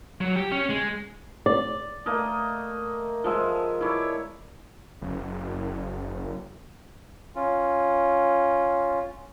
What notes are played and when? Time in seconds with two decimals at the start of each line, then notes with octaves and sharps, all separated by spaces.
0.21 F#3
0.36 G4
0.52 C#4
0.70 G#3
1.46 D5
2.06 A3 A#3 D#5
3.24 F3 G#3 E5
3.81 E4 C#5 D5
5.01 F#1
7.36 C#4 F4